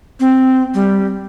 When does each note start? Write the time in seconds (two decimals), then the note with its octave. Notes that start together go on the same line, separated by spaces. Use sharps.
0.20 C4
0.74 G3